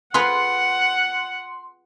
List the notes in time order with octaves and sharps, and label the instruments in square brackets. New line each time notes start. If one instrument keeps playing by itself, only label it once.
[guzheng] F4 G#4 B4 [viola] F#5 [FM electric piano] C6